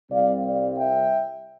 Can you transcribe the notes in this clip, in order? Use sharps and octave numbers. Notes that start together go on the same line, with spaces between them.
C2 C3 G3 C4 D5 F5
D5 F5
E5 G5